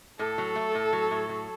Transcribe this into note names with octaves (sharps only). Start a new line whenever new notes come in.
A2 A4
F#3
A3
A2
F#3
A2
F#3